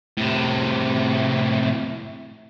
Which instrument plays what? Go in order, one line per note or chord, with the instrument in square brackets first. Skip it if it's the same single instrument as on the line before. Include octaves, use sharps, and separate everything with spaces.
[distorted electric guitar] A2 C3